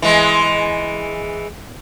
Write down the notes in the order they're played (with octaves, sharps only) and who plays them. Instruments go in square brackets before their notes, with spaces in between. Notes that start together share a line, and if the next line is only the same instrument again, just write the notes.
[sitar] E3 G#3